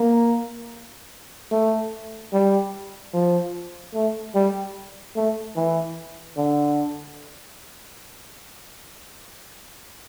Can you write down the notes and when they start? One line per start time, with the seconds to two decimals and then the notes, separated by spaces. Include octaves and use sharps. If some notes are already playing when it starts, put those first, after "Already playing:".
Already playing: A#3
1.52 A3
2.33 G3
3.14 F3
3.94 A3
4.35 G3
5.16 A3
5.56 E3
6.37 D3